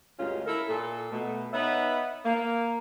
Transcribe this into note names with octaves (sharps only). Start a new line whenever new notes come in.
D2 G2 G#3 C#4 F4
E4 A4 A#4
A#2 A4
B2 A3
B3 D#4 B4 C#5 E5
A#3